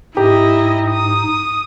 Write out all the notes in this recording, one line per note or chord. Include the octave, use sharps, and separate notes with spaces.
G#2 D#4 E4 G4 D#5
D#6